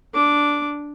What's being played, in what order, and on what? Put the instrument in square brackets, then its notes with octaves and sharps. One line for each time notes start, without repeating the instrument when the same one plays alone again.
[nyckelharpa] D4 D6